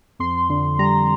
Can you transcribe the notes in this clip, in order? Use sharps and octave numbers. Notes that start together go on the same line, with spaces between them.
F2 C6
D3
G3 A#5